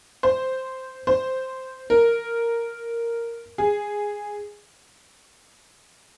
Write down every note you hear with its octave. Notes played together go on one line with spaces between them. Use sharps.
C5
C5
A#4
G#4